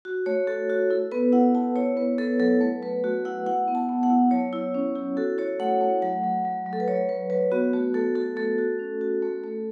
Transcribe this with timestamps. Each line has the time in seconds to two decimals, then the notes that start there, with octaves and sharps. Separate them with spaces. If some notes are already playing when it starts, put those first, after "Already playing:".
0.05 F#4
0.26 A3 C#5
0.47 F#4 A4
0.70 F#4
0.90 E4 A4
1.12 B3 B4
1.32 E4 F#5
1.55 E4 A5
1.76 E4 C#5
1.97 B3 B4
2.18 B3 A4
2.39 F#3 A4
2.61 A3 B4
2.82 A3 B4
3.04 A3 F#4
3.25 E4 F#5
3.46 E4 F#5
3.68 B3
3.75 A5
3.89 B3
4.03 F#5
4.10 E4
4.31 F#3 C#5
4.53 E4
4.74 C#4
4.95 E4
5.17 F#4 A4
5.38 F#4 C#5
5.60 A3 F#5
5.81 A3
6.02 F#3 F#5
6.23 F#3
6.45 F#3
6.66 F#3
6.73 A4
6.80 B4
6.88 F#3 C#5
7.09 F#3 B4
7.30 F#3 B4
7.52 B3 F#4
7.73 A3 F#4
7.94 A3 A4
8.15 F#4 A4
8.36 A3 A4
8.58 F#4
8.79 C#4
9.01 F#4
9.22 A3
9.44 A3